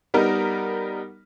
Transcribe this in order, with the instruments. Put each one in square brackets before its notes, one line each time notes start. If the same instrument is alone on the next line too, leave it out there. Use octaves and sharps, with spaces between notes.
[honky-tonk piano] G3 B3 D#4 A#4